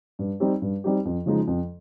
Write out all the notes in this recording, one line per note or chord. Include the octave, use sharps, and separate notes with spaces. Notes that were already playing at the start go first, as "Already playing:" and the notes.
G2
G3 C4 D#4 G4
G2
G3 C4 D#4 G4
F2
C#3 F3 G#3 D#4
F2